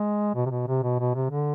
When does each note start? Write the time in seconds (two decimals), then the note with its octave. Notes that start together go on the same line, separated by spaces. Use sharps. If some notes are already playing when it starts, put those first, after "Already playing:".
Already playing: G#3
0.35 B2
0.46 C3
0.50 B2
0.67 C3
0.83 B2
0.99 B2
1.15 C3
1.31 D3